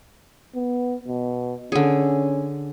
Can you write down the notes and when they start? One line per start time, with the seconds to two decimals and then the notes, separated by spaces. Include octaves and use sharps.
0.55 B3
1.08 B2
1.72 D3 C#4 G#4